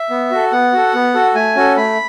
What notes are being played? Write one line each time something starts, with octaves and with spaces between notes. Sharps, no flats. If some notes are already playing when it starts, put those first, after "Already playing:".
Already playing: E5
B3
F#4 A4
B3 F#5
F#4 A4
B3
F#4 A4
A3 G#5
C#4 F#4 A4
A3 B5